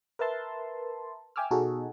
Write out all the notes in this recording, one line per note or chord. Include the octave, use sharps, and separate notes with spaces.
A#4 B4 E5 A5 C6
E5 G5 G#5 D6 E6 F6
B2 D#4 F#4 G#4 A4